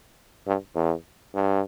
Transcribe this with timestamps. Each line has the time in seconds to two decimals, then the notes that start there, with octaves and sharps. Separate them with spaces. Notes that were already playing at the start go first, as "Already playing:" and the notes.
0.47 G2
0.75 E2
1.35 G2